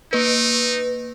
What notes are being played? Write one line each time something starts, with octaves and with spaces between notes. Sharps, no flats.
A#3 D#4 B4